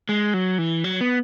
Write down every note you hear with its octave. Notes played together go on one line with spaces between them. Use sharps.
G#3
F#3
E3
F#3
B3